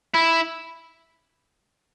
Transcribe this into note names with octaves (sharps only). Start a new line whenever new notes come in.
E4